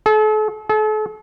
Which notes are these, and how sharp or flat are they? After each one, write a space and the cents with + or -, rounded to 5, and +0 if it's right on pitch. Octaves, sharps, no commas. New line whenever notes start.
A4 -40
A4 -40